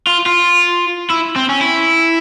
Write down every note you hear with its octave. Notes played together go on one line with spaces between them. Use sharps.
F4
F4
E4
C4
C#4
E4